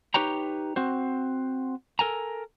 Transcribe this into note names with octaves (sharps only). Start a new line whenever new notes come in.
D#4 G4 B4 C#5 G5 A#5
C4 F#4 C5
A4 A#4 G#5 A#5